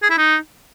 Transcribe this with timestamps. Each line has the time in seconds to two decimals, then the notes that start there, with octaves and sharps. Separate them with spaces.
0.03 G#4
0.10 E4
0.18 D#4